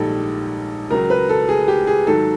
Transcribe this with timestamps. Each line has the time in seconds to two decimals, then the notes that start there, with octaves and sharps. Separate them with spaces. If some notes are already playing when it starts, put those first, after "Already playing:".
Already playing: A#1 G#2 D#3 G3 A4
0.90 C#2 C#3 F#3 A#4
1.10 B4
1.29 A4
1.49 G#4
1.68 G4
1.87 G#4
2.07 G#2 D#3 F#3 A4